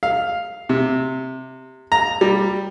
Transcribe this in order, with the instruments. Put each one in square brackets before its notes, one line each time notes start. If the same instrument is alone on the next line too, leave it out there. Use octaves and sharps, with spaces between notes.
[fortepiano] F5
C3
A#5
G3